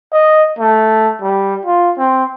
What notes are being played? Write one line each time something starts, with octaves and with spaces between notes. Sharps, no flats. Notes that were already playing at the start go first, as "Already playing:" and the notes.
D#5
A3
G3
F4
C4